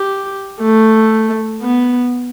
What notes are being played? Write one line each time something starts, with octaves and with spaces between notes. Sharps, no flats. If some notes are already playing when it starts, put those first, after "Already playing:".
Already playing: G4
A3
B3